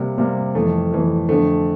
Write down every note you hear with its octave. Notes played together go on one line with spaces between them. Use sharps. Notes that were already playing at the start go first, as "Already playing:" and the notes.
Already playing: C3 G3 A#3
C3 G3 A#3
F2 E3 A3
F2 E3 A3
F2 D3 A3